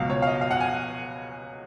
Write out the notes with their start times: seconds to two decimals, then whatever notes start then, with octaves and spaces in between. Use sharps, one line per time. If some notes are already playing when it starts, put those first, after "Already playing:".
Already playing: C#2 B2 F#3 F5
0.10 C#5
0.22 F5
0.27 D#5
0.41 F5
0.51 F#5
0.60 G#5